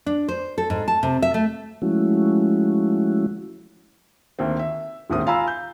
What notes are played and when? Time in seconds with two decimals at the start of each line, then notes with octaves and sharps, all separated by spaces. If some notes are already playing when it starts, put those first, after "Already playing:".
0.06 D4
0.28 C5
0.58 A4
0.70 G#2
0.88 A5
1.03 C3
1.22 E5
1.34 A3
1.82 F3 G#3 A3 C#4 E4 F#4
4.39 D2 D#3 A#3 C4
4.59 E5
5.10 D#1 D2 G#2 A#3 C4 D#6
5.26 F4 F5 G#5 A#5 B5 E6
5.47 G6